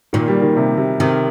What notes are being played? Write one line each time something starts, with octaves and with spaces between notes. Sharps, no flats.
A#2 D#3
G3
D#3
C3
C3
C3 D#3